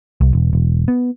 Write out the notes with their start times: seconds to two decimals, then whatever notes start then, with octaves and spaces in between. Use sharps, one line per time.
0.21 C2
0.33 E1
0.53 E1
0.88 B3